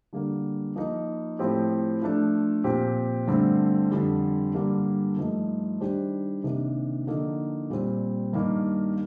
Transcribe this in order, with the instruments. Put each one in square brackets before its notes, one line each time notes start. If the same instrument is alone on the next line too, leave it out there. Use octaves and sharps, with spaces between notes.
[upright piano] D3 G3 A#3
F3 A#3 D#4
A2 F3 C4 G4
F3 A3 D4
A#2 F3 C4 G4
G2 D3 A3 C4
F2 D3 G3
G2 D3 G3 A#3
G2 F3 A3 D#4
D#3 G3 D4 G4 C5
C3 D#3 A#3 D4
D3 F3 A#3 D#4 A4
A#2 G3 C4
G2 D#3 A#3